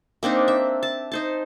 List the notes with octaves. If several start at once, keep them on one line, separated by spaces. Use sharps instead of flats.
A#3 C4 D4 D#4
E5
A5
D#4 C5 A5